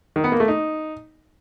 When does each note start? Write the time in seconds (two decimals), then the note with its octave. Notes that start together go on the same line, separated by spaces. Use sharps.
0.16 D#3
0.24 B3
0.32 A#3
0.40 A3
0.48 D#4